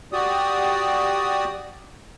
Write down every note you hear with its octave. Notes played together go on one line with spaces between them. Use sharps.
F#4 G4 D5 D#6